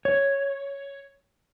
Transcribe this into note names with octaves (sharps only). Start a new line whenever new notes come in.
C#5